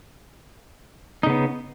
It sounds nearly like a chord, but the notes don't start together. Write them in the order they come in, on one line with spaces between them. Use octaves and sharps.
D#4 C#3 B3